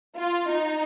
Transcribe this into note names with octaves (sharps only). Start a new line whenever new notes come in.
F4
D#4